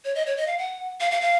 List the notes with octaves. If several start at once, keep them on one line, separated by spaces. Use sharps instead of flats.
C#5
D#5
C#5
D#5
F5
F#5
F5
F5
F5